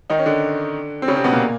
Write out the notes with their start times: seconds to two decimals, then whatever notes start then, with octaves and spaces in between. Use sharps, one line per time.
0.10 D#3 D#4
0.19 C#4
0.26 D3 D4
1.02 C4
1.08 C#3 C#4
1.16 C3 C4
1.24 B2 B3
1.32 A#2 A#3